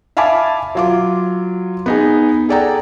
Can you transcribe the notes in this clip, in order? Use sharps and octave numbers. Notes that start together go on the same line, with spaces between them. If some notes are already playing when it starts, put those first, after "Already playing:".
E5 F5 G#5 A5 B5 D6
F#3 F4 D6
B3 D#4 G#4
G#4 A4 D5 F#5 G5 A#5